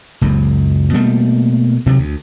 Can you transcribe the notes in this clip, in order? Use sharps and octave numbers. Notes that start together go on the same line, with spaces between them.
F#1 C#2 F#2
B2 G3 A3 A#3
D2 C3 F#3
D2